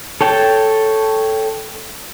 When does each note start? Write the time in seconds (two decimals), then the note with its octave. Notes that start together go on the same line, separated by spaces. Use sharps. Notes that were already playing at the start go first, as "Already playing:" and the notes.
0.21 A4 C#5 G5 A5